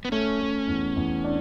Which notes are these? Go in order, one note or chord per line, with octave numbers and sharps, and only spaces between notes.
B3
A3 C#4
A3
E2
E2
D4